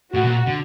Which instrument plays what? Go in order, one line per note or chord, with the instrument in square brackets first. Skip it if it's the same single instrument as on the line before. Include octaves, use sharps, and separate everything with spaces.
[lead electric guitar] A2 [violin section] F#4
[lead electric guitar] A#2
D3